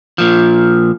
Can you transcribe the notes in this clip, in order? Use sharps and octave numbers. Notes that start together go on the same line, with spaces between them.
A#2 F3